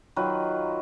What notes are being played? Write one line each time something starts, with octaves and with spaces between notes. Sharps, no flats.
D#3 F#3 F4 B4